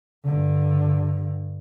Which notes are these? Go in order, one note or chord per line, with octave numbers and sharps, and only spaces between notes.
G2 D3